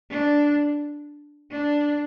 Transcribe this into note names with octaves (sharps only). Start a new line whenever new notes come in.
D4
D4